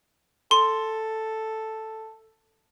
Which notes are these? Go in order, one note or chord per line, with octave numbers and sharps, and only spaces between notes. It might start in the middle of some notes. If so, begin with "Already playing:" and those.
A4 C6